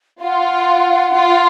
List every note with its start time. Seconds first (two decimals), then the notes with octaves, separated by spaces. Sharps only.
0.23 F4 F#5
1.14 F4